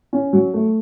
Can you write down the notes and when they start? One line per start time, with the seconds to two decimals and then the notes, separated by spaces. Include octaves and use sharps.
0.13 C#4
0.33 F#3
0.54 A3